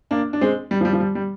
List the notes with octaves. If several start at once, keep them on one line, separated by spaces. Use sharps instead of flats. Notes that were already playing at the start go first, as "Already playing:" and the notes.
A#3 D4
D4
G#3 C4
G3
F3
G3
F3
G3
G3